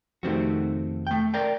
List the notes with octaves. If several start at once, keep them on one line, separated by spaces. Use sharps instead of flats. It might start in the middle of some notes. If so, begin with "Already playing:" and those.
F2 C3 D#3 A3 C4 F#4
A3 G5
A#4 D5 G5